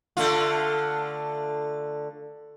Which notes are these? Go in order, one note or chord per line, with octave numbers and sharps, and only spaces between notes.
D3 A3 F4